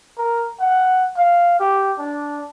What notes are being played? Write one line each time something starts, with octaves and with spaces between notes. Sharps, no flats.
A#4
F#5
F5
G4
D4